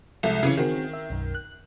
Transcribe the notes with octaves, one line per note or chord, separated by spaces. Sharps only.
C2 F3 G#3 A4
C#3 E3 C#4 C7
D#3 C4 F#4 G#4
E5
B1 F#2
F#6